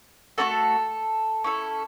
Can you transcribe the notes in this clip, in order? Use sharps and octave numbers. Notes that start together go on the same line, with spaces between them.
A3 C#4 F#4 A4 A5
C#4 E4 A4